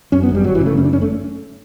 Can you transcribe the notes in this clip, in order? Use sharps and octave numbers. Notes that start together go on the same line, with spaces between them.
F#2 C#4
B3
G1
G3
G1 F#3
E3
C#3
A3
F#2 C#4
D4
G1 C#4
A3